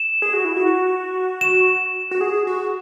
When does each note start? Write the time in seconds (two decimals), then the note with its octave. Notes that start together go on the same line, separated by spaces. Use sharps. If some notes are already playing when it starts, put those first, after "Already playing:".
Already playing: E7
0.22 G#4
0.33 F#4
0.45 E4
0.57 F#4
1.41 E7
2.11 F#4
2.21 G#4
2.47 F#4